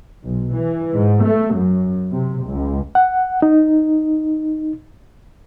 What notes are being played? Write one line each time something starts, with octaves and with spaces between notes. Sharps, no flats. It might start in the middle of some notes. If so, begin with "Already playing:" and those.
B1
E3
G#2
A3
F#2
C3
C#2
F#5
D#4